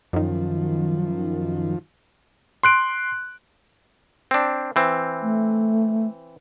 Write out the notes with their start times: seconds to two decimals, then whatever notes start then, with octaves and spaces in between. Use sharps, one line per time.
0.13 F#2 D#3 F3
2.63 C6 F#6 D7
4.31 C4 D4
4.76 E3 C4
5.23 A3